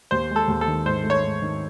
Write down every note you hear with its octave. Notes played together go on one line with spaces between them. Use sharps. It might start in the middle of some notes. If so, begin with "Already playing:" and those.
D#2 C5
G#3
A4
D#2
A4
D#3
G#2 C5
A3
C#5
G#2
D#3